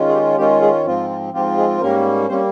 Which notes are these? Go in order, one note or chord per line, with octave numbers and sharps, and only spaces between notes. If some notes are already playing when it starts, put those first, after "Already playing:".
Already playing: D#3 G#3 C#4 F4
G#4
G4
D#3 G#3 C#4 F4 G4
G#3 G#4
G#2 F3 C4 F4
F4
G#2 F3 C4 F4 G4
G#3 G#4
G#2 G3 A#3 C#4 A#4
G3 A#3 C4 C#4 C5